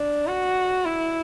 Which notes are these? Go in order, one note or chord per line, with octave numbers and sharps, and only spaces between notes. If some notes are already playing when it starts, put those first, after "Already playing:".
Already playing: D4
F#4
E4